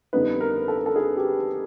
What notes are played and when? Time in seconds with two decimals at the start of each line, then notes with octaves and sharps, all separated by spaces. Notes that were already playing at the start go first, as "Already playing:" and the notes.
0.13 F2 D3 G3 B3 D#4 B4
0.41 A#4
0.68 A4
0.77 A#4
0.86 A4
0.96 G#4
1.17 G4